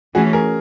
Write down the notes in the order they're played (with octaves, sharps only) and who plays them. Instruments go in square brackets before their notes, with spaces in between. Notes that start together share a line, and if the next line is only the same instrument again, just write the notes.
[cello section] E3 A3 C#4 [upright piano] F#4 G#4
[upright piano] G#4 A#4